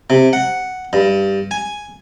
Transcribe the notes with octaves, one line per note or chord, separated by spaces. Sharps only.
C3
F#5
G2
G#5